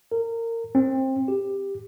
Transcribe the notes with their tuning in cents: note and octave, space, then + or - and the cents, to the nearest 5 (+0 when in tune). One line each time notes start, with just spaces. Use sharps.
A#4 -25
C4 +20
G4 +10